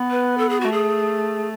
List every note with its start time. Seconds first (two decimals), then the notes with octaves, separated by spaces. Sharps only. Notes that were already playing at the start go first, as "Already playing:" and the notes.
Already playing: B3
0.11 B4
0.38 A4
0.49 G#4
0.61 A3 F#4
0.72 G#4